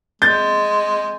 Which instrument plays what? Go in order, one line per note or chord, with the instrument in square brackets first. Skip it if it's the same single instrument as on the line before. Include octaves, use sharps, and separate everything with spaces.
[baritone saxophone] G#3 [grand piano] G6 A6